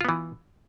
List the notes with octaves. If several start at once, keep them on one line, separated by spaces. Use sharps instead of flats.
E3 B3 F4